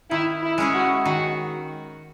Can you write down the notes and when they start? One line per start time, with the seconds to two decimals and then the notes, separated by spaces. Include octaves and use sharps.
0.11 D#3 E4
0.42 E4
0.58 G#3 C#4 E4 G#4
0.74 F#4
1.06 D#3 F#4